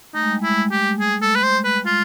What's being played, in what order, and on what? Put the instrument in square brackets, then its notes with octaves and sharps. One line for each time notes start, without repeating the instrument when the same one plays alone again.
[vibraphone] A3 [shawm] D#4
[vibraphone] G#3
G3
[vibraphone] G#3 [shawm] E4
[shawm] G4
G#4
A4
B4
C5
B4
[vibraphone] G3
[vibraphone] G#3 [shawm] F4